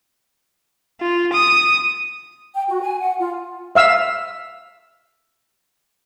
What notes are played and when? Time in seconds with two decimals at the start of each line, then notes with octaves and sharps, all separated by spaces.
1.01 F4
1.33 D#6
2.54 G5
2.69 F#4
2.82 G#5
3.00 F#5
3.19 F4
3.75 E5 F5 E6